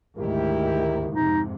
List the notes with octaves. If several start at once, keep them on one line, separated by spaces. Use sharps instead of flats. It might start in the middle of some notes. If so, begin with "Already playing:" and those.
D2 G#2 D#3 E4 G4 A#4
F2 G#2 C3 D#4